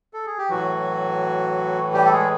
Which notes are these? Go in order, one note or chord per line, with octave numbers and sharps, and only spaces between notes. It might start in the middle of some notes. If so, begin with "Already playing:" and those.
A4
G#4
G4
A2 E3 F#3 F#4
G3 G4
A4
G#3 G#4